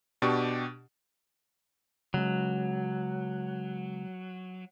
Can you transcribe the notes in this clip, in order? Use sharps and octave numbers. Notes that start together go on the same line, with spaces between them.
B2 D4 G4 C#6
C#3 F#3 G#3